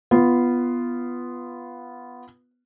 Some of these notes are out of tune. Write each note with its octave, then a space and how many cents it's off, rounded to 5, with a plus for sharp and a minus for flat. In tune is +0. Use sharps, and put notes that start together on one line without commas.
B3 +0 F4 -15